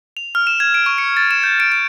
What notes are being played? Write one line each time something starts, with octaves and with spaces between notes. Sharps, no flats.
F7
F6
E7
G#6
D7
C#6
C#7
A6
E7
G6
D7
D7